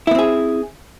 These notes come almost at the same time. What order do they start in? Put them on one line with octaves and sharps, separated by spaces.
E4 B3 C4 G#4